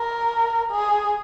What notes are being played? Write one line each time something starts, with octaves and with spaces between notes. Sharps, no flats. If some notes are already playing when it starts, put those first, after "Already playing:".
Already playing: A#4
G#4